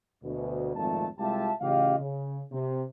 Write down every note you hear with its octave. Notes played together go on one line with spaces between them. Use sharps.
D2 B2
G#1 F2 A#2 A3 A5
C2 G#3 F4 G4 E5 A5
A1 C#3 F4 G4 D#5 F5
C#3
C3